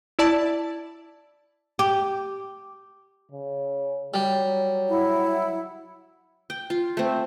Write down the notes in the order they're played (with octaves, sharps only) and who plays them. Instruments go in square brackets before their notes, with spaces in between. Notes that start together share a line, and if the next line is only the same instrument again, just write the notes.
[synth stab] E4 D5 A5
[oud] G4
[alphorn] C#3
[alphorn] F#3 [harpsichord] G3
[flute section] E4 F#5
[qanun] G5
F4
A3 C4